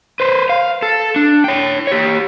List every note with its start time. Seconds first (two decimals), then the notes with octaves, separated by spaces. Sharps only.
0.20 B4 C5
0.49 F5
0.82 A4
1.16 D4
1.44 C#5 G5
1.87 G4 C#5